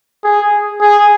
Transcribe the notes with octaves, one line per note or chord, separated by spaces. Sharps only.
G#4
G#4